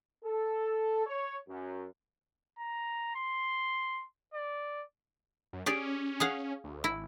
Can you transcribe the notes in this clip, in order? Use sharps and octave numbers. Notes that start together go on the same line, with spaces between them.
A4
C#5
F#2
A#5
C6
D5
F#2
C#4 G4 G#4 D5
G#4 F5 F#5
D2
G#1 E4